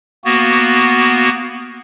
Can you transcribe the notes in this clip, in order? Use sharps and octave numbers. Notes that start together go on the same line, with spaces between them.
A#3 B3 F#4